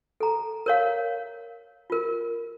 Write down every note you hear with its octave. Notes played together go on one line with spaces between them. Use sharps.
A4 A#5
A#4 C#5 F5
F4 A#4